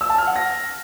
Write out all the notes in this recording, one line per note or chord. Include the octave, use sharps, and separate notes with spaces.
E6
A5
F6
F#5
A#6